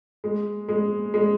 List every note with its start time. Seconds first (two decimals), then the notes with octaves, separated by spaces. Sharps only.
0.24 G#3
0.69 G#3
1.14 G#3